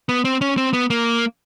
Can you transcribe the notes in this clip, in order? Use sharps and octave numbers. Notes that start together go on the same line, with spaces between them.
B3
C4
C#4
C4
B3
A#3